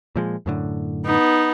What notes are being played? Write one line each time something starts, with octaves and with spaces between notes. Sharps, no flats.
A#2 F3 G#3
F#2 A2 D3
B3 D#4